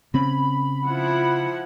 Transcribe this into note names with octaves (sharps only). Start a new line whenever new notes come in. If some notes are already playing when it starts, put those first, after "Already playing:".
C#3 C4 C#4 B5
F3 E4 F#5